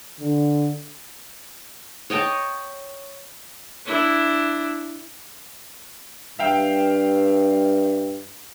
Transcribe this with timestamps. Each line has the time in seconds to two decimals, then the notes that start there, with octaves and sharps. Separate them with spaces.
0.20 D3
2.10 C#5 D#5 G5 A5
3.85 D4 E4
6.39 G2 E5 F5 G5